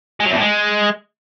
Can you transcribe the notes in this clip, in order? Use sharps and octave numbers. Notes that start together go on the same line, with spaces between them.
G#3
F#3
E2
A2
G#3